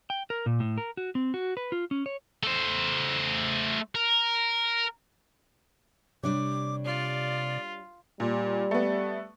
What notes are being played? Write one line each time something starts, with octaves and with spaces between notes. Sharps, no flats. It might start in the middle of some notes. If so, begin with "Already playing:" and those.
G5
A#4
A#2
A2
A#4
F#4
C4
F#4
B4
F4
C#4
C#5
A3 C5
A#4
C3 G3 D4 C#5 D6
F4 D5
A#2 G3
A3 B3